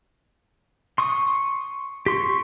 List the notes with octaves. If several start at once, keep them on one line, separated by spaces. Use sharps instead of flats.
C6 C#6 D#6
G4 C6 C#6